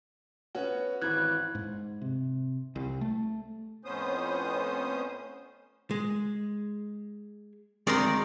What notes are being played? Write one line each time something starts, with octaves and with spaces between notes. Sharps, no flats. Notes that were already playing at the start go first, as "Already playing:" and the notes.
B3 C#4 F#4
G#1 E3 F#6 G#6
G#2
C3
C2
A3
F2 A2 B3 C#4 C5 D#6
G#3
D2 D#3 G#3 C4 D5 A#5 C6